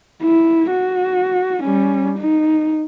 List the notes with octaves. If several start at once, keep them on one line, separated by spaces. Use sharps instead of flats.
E4
F#4
G3 C#4
D#4